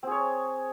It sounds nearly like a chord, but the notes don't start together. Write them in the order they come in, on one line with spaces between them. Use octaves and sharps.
C4 G#4 C#5